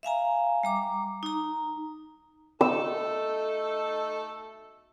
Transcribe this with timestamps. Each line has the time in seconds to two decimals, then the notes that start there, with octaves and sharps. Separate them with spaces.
0.03 E5 F5 G#5 A#5
0.63 G3 A#5 D6
1.23 D#4 A#5
2.61 A3 D#4 A4 E6